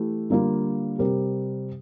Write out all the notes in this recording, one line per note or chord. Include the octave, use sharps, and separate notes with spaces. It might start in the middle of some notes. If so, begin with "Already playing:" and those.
Already playing: E3 A3 E4 G4
D3 G3 A#3 F4
C3 G3 C4 G4 A#4